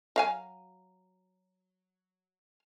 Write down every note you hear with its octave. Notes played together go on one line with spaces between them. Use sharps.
F#3 F5 G#5